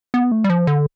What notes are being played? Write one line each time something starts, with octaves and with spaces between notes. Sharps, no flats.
B3
A3
G3
F3
D3